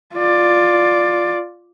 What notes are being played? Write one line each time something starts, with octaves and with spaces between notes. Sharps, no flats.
F4 D5